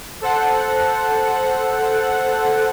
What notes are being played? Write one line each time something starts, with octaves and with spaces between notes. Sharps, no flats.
A4 C5 F#5